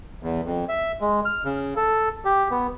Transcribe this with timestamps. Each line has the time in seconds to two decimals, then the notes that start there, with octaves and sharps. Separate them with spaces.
0.23 E2
0.46 F2
0.69 E5
1.01 G#3
1.25 F6
1.45 C#3
1.76 A4
2.25 G4
2.51 B3